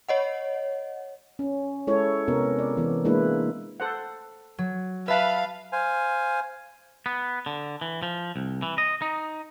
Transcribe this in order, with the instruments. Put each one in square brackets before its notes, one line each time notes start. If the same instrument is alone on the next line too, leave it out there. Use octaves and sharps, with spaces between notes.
[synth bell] C#5 D#5 F#5
[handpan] C#4
G#3 E4 A4 C#5
C3 B3 C#4 A#4
D5
E3 B3
G#3 A#3 D4 E4 B4
[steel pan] A4 C5 F#5
[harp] F#3
[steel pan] B4 B5 [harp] E5 A5 [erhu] F5
[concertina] C5 F5 G#5
[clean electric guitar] B3
D3
E3
F3
C2
E3
D#5
D#4